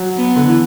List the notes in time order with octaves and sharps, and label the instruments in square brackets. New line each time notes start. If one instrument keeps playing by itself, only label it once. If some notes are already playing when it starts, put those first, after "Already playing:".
Already playing: [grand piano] F#3
[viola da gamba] B3
[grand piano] D3
E3